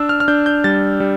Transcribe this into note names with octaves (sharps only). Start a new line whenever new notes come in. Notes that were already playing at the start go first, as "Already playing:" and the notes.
Already playing: D4 E6
F6
F6
D4 G6
G6
G3 A6
G3